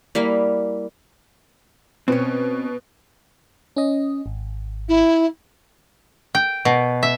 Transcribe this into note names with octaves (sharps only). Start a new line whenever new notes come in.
G3 A#3 E4 F5
B2 C4 C#4
C#4 D#5
G#1
E4
G5
B2
E5